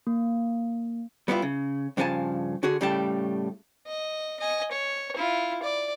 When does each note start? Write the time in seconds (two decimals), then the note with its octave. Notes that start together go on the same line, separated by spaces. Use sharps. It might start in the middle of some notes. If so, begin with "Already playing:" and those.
0.07 A#3
1.28 G3 B3 D4 E4 F4
1.42 C#3
1.97 G2 C#3 F3 A#4 G#5 A5
2.63 D3 F#4 G#4
2.81 A2 C#3 G3 A3 G4 A5
3.87 D#5
4.40 D#5 G#5
4.71 C#5
5.16 E4 F4
5.63 D5